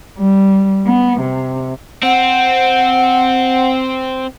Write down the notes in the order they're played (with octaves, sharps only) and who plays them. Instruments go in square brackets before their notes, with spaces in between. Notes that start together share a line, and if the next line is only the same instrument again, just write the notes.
[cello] G3
B3
C3
[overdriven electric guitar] C4 [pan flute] F#5